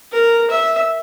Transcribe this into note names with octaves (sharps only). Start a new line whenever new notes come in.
A#4
E5